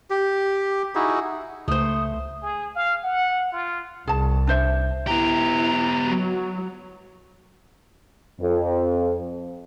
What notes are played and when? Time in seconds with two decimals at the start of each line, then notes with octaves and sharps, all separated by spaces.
0.10 G4
0.95 D#4 E4 F#4 G#4
1.68 C#2 A3 C5 D#6
2.42 G#4
2.75 F5
3.04 F#5
3.52 F4
4.08 C2 G#4 A5
4.47 D4 C5 E5
5.07 B3 E4 G4 A#5
6.07 F#3
8.41 F2